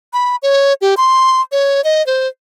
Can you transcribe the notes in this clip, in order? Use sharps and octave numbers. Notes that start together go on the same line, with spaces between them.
B5
C#5
G4
C6
C#5
D#5
C5